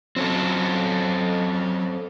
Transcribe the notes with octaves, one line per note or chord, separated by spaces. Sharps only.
F#3 C4 C#4 A4